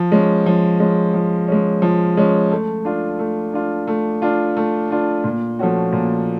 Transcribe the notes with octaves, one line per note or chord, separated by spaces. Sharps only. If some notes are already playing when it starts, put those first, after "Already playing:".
Already playing: F3
G#3 C#4
F3
G#3 C#4
F3
G#3 C#4
F3
G#3 C#4
A3
D4 F4
A3
D4 F4
A3
D4 F4
A3
D4 F4
A#2
F3 A3 C#4 F#4
A#2